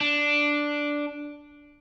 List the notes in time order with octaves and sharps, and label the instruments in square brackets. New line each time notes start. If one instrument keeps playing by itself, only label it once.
[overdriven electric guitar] D4